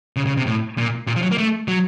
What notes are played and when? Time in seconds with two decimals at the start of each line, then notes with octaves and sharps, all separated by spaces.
0.16 C#3
0.27 C#3
0.37 C3
0.47 A2
0.78 A#2
1.07 A#2
1.16 F3
1.22 F#3
1.32 A#3
1.38 A3
1.68 F#3